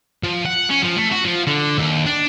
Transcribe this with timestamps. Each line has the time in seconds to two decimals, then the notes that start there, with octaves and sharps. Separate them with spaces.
0.24 F3
0.46 F#5
0.70 C#4
0.83 F3
0.97 A3
1.12 F#4
1.25 F3
1.47 D3
1.78 D#2
2.06 D4